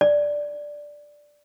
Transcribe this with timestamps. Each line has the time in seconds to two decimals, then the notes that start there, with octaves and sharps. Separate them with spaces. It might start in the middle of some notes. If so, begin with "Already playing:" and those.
0.01 D5